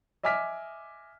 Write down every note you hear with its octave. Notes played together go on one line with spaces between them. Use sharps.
D#5 E5 G#5 D6 F6 B6